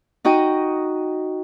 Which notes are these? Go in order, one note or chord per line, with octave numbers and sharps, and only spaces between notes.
D#4 F#4 D#5 G5